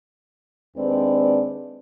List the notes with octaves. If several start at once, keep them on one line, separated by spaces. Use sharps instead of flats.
D#2 G#3 C4 D4 B4 D5